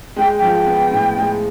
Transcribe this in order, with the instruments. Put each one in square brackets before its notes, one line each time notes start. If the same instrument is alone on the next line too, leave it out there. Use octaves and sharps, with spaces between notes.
[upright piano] G#3 [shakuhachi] G5
[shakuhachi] G5
[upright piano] F3
B3
A2
G#3